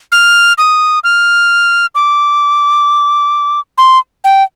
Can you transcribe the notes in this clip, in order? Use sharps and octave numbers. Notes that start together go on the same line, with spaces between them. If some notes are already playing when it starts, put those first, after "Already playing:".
F6
D#6
F6
D6
C6
G5